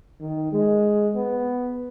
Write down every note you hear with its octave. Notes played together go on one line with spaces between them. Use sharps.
D#3
G#3
B3